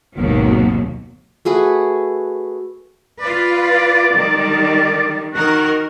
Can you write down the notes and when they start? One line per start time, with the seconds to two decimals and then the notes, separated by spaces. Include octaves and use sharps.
0.14 G#1 D#2 B2 F#3
1.45 A3 F#4 G#4 B4
3.21 F4 B4 D5
4.14 D#3 G3
5.33 D#3 F#4 A#4